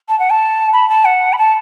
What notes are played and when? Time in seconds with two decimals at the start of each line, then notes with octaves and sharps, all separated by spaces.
0.09 A5
0.19 F#5
0.30 A5
0.73 B5
0.89 A5
1.05 F#5
1.33 B5
1.38 A5